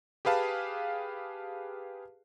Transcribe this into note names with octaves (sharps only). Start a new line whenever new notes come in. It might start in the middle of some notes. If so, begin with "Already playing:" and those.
G4 G#4 B4 F5 A5